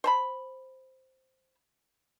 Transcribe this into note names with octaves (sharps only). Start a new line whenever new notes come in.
C5 A5 B5